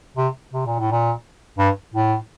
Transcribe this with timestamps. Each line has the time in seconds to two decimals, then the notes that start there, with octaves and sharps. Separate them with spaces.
0.17 C3
0.53 C3
0.66 A#2
0.79 A2
0.91 A#2
1.59 G2
1.94 A2